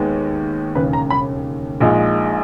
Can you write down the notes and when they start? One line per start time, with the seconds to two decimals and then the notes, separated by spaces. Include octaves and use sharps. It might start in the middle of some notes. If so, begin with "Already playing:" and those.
Already playing: D#2 D#3 G#3 B3
0.75 E1 D#2 C#3 B4
0.93 A#5
1.10 B5
1.80 A#1 A#2 G#3 D#4